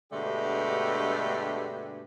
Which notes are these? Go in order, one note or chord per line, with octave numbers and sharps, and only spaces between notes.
G2 B2 D3 G#3 A3 G4